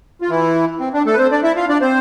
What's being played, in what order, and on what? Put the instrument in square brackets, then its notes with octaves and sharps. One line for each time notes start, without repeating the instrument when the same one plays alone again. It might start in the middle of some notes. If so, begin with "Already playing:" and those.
[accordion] F4
E3 E4
C4
D4
A3 A4
B4
C4 C5
D4 D5
E4 E5
F4 F5
D4 D5
C4 C5